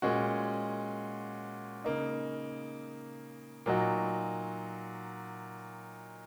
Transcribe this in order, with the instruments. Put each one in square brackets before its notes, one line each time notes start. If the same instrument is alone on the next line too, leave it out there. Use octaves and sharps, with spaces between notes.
[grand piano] A#2 G#3 C#4 F#4
C#3 A#3 D#4
A#2 F#3 D#4 F#4